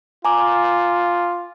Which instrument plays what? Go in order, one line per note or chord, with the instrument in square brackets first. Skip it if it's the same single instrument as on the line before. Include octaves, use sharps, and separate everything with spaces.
[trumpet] F4 [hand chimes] G#5 A#5 D6